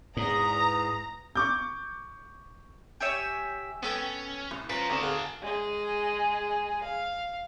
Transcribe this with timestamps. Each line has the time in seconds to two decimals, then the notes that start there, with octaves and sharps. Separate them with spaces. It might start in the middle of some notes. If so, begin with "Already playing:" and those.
0.17 E2 G#2 A#5 D#6
1.36 C#6 D6 G6
3.00 G4 C#5 E5 G#5
3.83 B3 C#4 A4 G5
4.51 C2
4.70 F3 C#4 B4 A#5
4.90 D2 C4 D#4 A5
5.02 G#4 A#4 F5 F#5
5.42 G#3 G#4
6.83 F5